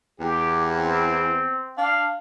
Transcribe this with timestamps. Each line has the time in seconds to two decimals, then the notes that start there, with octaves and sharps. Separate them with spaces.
0.20 E2 G4
0.78 C4
1.78 D4 F5